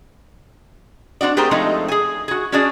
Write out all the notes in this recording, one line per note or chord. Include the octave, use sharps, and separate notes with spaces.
C4 D4 F#4 D5
A3 C4 G4 G#4 A#4 C5
F3 G#3 A3 C4 D#4
G#4 G#5
F#4 G#4
C#4 D4 F#4 G#4 D5